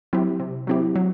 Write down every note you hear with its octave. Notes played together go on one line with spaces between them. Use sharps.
F#3 C4 E4 G4
C3
F#3 C4 E4 G4
F#3